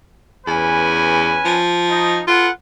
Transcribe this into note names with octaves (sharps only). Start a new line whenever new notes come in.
E2 C#4 B4 G#5
F3
D#4
F4 A4 B4 F#5